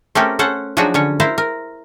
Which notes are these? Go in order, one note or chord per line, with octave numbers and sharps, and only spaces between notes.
A3 C4 C#4 G4 A4 A#4
C#4 A4 C5 F#5
F3 F#3 D4 D#4 F#4 G#4
D3 C#4 C#5
E4 A#4 C5 F5
A#4